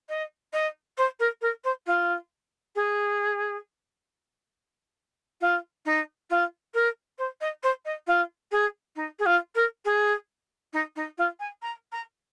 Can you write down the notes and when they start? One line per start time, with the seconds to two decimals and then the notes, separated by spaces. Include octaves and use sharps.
0.09 D#5
0.53 D#5
0.97 C5
1.20 A#4
1.41 A#4
1.64 C5
1.86 F4
2.75 G#4
5.41 F4
5.86 D#4
6.30 F4
6.74 A#4
7.18 C5
7.41 D#5
7.63 C5
7.85 D#5
8.07 F4
8.52 G#4
8.96 D#4
9.19 G#4
9.26 F4
9.55 A#4
9.85 G#4
10.73 D#4
10.96 D#4
11.18 F4
11.40 G#5
11.62 A#5
11.92 A#5